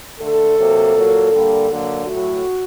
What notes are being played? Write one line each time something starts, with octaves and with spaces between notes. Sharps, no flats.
D3 A3 A4
C3 F#3 A#3
A#2 F#3 A#3
D3 G3 A#3
D3 F#3 A#3
A2 F#3 A3 F#4